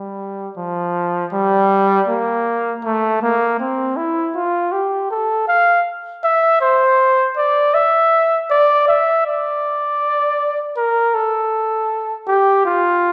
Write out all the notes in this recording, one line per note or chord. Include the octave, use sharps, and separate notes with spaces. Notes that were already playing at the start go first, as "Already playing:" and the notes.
Already playing: G3
F3
G3
A#3
A3
A#3
C4
E4
F4
G4
A4
F5
E5
C5
D5
E5
D5
E5
D5
A#4
A4
G4
F4